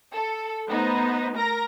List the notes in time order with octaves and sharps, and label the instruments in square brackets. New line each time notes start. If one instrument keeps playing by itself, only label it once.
[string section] A4
A3 B3 D#4 C5
A#4 A#5 A#6